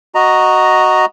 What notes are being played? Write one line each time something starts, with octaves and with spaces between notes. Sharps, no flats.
F#4 D#5 A#5